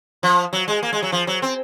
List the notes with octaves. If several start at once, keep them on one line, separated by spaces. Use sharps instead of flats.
F3
F#3
G#3
A#3
G#3
F#3
F3
F#3
C4